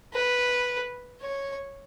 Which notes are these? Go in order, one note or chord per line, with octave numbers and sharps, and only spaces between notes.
B4
C#5